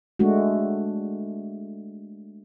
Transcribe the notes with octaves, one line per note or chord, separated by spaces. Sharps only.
G#3 A3 D4 F#4